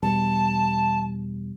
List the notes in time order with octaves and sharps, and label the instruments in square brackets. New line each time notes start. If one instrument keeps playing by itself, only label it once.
[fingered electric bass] E2 B2 G3 [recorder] A5